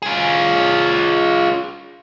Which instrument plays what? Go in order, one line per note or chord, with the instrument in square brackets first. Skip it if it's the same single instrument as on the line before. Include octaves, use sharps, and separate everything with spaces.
[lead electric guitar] F4 G#4